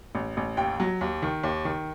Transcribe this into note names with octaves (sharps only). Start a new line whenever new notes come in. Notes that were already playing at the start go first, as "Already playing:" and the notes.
A1
A1
D#2 G5
F#3
D#2
D#3
D#2
D#3